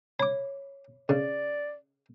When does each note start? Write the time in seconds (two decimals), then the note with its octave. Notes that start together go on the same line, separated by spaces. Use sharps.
0.20 C#5 B5 D6
1.09 C#3 D5